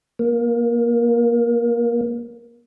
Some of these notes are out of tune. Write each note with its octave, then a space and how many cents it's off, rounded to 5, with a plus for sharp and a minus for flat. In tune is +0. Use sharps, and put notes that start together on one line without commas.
A#3 +20